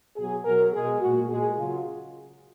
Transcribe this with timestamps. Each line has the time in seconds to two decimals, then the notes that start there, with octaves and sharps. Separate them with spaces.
0.17 B2 F#3 G#4
0.45 B2 F#3 A#4
0.72 B2 G#3 G#4
1.01 A#2 G#3 F#4
1.30 A#2 G#3 G#4
1.57 C#3 F#3 F4